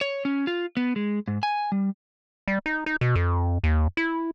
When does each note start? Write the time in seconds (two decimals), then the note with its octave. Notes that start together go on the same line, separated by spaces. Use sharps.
0.01 C#5
0.25 C#4
0.47 F4
0.77 B3
0.96 G#3
1.28 G#2
1.43 G#5
1.72 G3
2.48 G3
2.66 D#4
2.86 D#4
3.01 B2
3.16 F2
3.64 D#2
3.97 E4